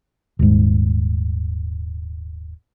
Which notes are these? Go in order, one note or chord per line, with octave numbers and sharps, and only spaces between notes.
D#1 G#2